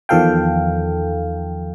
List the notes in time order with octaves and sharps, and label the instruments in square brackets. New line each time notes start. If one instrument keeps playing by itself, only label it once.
[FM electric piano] E2 D#3 F3 A4 F5 G5